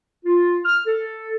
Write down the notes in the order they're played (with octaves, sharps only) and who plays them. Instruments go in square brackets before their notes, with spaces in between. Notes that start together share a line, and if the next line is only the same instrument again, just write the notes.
[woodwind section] F4
F6
A4